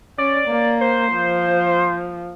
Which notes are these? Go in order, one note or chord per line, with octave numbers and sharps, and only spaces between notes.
C#4 D5
A#3
C5
F3